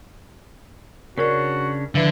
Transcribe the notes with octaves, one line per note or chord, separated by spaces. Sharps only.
C#3 C#4 D4 F#4 A#4 D5
D3 D#3 F3 E4 B4